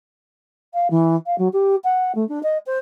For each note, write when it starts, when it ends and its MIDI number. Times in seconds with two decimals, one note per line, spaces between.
0.73 0.87 77
0.90 1.16 52
1.26 1.35 77
1.38 1.48 54
1.53 1.75 67
1.84 2.12 78
2.15 2.27 57
2.28 2.41 62
2.43 2.57 75
2.66 2.78 72